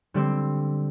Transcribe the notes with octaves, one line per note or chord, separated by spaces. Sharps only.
D3 G3 C4